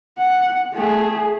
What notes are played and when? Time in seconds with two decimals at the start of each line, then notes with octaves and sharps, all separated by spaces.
0.18 F#5
0.73 A3 G#4